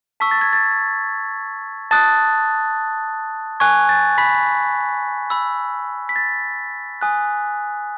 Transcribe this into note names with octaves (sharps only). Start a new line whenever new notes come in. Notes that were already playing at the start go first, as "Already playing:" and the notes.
A5 C#6 E6 B6
A6
G#6
A6
A5 D#6 F#6 A6
G#5 C#6 F#6 G#6
A6
B5 B6
B5 E6
B6
A6
G#5 D#6 F#6